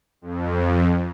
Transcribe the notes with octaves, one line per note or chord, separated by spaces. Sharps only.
F2